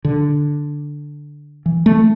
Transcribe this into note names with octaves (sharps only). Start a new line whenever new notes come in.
D3
E3
A3